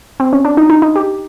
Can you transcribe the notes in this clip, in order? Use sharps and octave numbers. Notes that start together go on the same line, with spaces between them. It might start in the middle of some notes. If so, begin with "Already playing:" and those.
C4
C#4
D4
D#4
D#4
D#4
G4